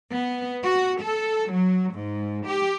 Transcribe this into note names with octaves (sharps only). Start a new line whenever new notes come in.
B3
F#4
A4
F#3
G#2
G4